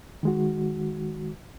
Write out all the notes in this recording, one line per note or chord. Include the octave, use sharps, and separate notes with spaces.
D#3 G#3 F#4